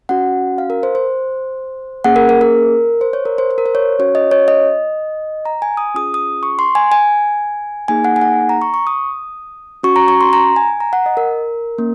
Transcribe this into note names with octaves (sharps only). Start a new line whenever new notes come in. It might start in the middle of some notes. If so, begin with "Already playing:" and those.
C#4 F#4 F#5
F5
A#4
C5
C5
A#3 C#4 G#4 F#5
A#4
A#4
A#4
C5
C#5
A#4
C5
C5
A#4
C5
C#5
C#4 F#4 C#5
D#5
C#5
D#5
A#5
G#5
D#6
C#4 F4 G#4 D#6
D#6
C#6
C6
G#5
G#5
A#3 D#4 G#4 G#5
F#5
G#5
F#5
A#5
C#6
C#6
D#6
C#4 F#4 C#6
A#5
C#6
C6
A#5
G#5
A#5
F#5
D#5
A#4
A#3 C#4